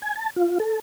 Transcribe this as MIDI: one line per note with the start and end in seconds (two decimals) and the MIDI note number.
0.02 0.14 80
0.16 0.30 81
0.36 0.58 65
0.60 0.79 69